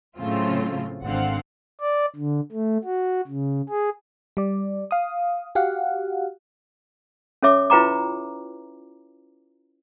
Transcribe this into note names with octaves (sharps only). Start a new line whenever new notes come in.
A2 C#3 F#3 A3 C4 F4
G#1 D3 C4 F5 F#5
D5
D3
A3
F#4
C#3
G#4
G3 D5
F5 D#6
F#4 G4 F5 F#5
C#4 A4 C#5 E5 D6
E4 F4 B4 G5 A#5 D6